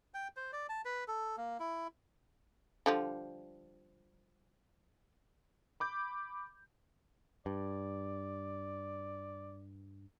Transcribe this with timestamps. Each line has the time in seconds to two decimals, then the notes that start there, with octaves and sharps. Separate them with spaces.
0.14 G5
0.37 C5
0.53 D5
0.69 A5
0.85 B4
1.08 A4
1.38 A#3
1.60 E4
2.86 D3 F3 G3
5.80 B5 D6 G6
7.46 G2 D5